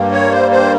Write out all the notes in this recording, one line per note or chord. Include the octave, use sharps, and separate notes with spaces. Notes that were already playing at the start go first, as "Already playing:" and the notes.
Already playing: G2 G3 A#3
C#5
C5
C5